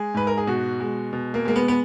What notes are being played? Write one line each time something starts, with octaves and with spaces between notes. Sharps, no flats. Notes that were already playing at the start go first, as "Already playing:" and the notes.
Already playing: G#3 G#4
G#2 B4
A#4
G#4
B2 F#4
G#3
B2
A#3
G#3 A#3
B3
B3